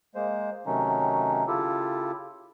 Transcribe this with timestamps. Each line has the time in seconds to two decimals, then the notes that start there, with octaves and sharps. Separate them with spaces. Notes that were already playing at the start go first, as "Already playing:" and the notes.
0.15 G#3 A#3 C5
0.66 C3 D#3 F#3 A3 C#4 D#4
1.48 C#3 E4 F4 G4 A4